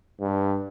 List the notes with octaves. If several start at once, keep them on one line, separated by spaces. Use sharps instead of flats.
G2